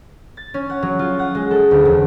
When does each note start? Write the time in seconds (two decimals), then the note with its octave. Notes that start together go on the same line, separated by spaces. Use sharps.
0.37 A6
0.54 C#4
0.70 F#5
0.82 F#3
0.99 F4
1.19 F#5
1.35 G#3
1.51 A4
1.71 D2
1.85 E1